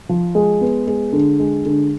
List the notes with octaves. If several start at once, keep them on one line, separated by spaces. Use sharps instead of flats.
F3
G#3
B3
G#3
D3
G#3
D3